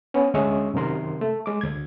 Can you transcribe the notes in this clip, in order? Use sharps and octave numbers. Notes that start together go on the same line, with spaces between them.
B3 C#4
D2 G#3 C#4 E5 C#6 D#6
F#2 C3 D#3 A#4 C6
A3
G#3 D6
D2 G#6